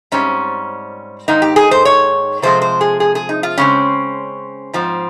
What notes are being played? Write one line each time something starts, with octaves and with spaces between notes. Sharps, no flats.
G#2 G3 C4 C#4
G#2 D#3 A#3 D#4
G4
G#4
C5
C#5
C3 F3 G#3 C4 C5
C5
G#4
G#4
G#4
D#4
F4
C#3 G#3 C4 C#4
G#2 F3 C4